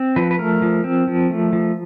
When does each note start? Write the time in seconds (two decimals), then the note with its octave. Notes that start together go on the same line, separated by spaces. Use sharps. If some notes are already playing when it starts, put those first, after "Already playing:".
Already playing: C4
0.16 F3 B4
0.31 B4
0.39 A3 A#4
0.62 F3
0.84 C4
1.08 F3
1.30 A3
1.53 F3